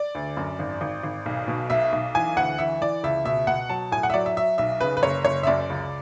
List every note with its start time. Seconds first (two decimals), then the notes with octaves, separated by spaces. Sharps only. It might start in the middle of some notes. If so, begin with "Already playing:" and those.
Already playing: D5
0.15 D2
0.37 F#2
0.59 G#1
0.81 G#1
1.03 G#1
1.26 B1
1.48 B2
1.70 B1 E5
1.92 B1
2.15 E3 G#5
2.36 D2 F#5
2.58 E3 E5
2.81 E3 D5
3.03 C#2 E5
3.25 B2 E5
3.47 B2 F#5
3.69 F#3 A5
3.91 A2 G#5
4.03 F#5
4.10 E5
4.14 F#3 D5
4.26 E5
4.37 F#3 E5
4.58 B1 E5
4.81 C#3 B4
4.97 B4
5.02 F#1 C#5
5.25 F#1 C#5
5.43 E5
5.47 F#2 D5
5.70 C#2